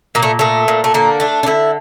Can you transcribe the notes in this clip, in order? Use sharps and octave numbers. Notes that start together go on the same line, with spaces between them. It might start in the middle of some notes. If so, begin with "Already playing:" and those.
A#2 A#3
A3
A#2 A3
A#2
A3
D3 A#3
A3 D4
D4
D3 E4